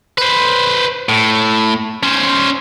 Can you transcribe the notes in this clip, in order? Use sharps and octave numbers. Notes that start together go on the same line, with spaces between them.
B4 C5
A2
C#4 C5